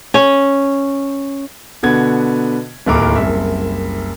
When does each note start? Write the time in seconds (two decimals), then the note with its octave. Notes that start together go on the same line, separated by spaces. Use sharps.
0.14 C#4
1.83 B2 D3 B3 G#6
2.86 D1 D#2 A2 A#4 D6
3.16 F#1 C2 E5